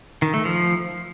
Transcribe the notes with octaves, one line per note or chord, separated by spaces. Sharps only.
D#3
A3
F3